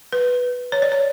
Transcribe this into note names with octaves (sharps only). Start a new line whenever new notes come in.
B4
C#5
D5
C#5